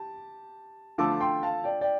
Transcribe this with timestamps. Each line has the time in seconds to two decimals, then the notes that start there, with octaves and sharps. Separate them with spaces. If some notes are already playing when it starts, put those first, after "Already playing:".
Already playing: G4 A5
0.98 D3 F3 A3 F4 A4 A5 D6
1.20 G5 C6
1.43 F5 A5
1.64 D5 G5
1.81 D5 G5